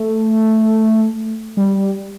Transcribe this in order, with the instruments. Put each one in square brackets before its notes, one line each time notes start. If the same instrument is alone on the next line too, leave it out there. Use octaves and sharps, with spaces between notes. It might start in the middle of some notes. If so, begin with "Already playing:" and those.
Already playing: [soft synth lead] A3
G3